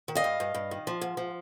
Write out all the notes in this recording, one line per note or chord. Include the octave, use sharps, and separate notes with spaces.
D#3
D#5 F5
G2
G2
G2
D#3
F3
G#2
F3